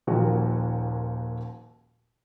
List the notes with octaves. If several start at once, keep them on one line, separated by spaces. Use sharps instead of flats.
D#1 D#2 F3 A#3 F#4